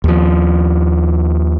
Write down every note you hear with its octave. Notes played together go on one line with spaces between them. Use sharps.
D#2 F3